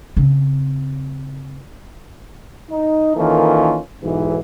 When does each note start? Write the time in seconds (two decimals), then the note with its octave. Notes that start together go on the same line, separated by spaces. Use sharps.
0.17 C#3 C4
2.70 D#4
3.16 D#3 E3 A#3 C#4 F4 A4
4.03 B1 G#2 E3